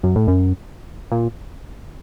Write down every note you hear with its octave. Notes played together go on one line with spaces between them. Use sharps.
F#2
A2
F#2
A#2